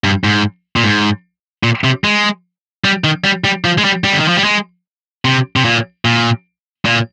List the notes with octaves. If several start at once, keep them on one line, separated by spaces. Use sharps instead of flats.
G2
G#2
A#2
G#2
A#2
C3
G#3
G3
D#3
G3
G3
F3
G#3
G3
G3
D3
D#3
F3
G3
G#3
C3
C3
A#2
A#2
A#2